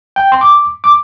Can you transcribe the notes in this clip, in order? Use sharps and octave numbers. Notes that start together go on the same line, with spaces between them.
G5
C6
D6
D6